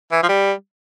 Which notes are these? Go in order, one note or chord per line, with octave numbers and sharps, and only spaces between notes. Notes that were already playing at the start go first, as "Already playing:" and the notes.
E3
F3
G3